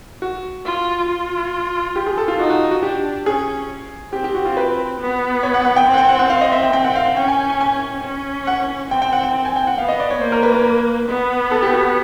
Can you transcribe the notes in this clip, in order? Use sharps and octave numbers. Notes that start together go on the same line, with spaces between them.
F#4
F4
F4
G4
G#4
A4
F4
D#4 F#4
F#4
F#4
D4 G4
C#4 G#4
C4 G4
G4
F#4
F4
B4
B3
C#5
F#5
F#5
G5
C4
F#5
G5
F#5
F#5
F5
D#5
E5
G5
C4 G5
F#5
F5
F#5
C#4 G5
G#5
G#5
G#5
C#4
F#5
C4 G5
G5
F#5
G5
G#5
G5
F#5
B3 F5
D#5
D5
C#5
A#3 C5
A#4
B4
B4
B3
A4
G4
F#4